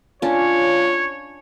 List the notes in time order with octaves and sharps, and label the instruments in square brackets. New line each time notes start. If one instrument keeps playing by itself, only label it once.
[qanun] C#4 D4 [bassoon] F4 [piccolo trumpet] C#5